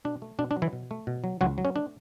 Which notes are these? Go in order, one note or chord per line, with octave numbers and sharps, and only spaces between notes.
B2 D4
A3
B2 D4
D4
F#3
E3 E4
B2
A3
B2
F#3
C#2 F#3 F#4
F#3
C#4
A3 D4